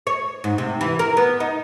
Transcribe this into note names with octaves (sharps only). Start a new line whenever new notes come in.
C#5
G#2
C3
E3
A#4
B3
D#4